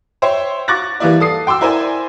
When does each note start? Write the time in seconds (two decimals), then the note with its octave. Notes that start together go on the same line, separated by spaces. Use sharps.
0.22 C5 C#5 E5 G5 C6
0.68 C#6 D6 F#6 A6 A#6
1.00 E3 G3 A#3 E4 D5
1.20 A4 D#6 C7
1.47 G5 C6 D6 E6
1.61 E4 A#4 C5 D5 G#5 C6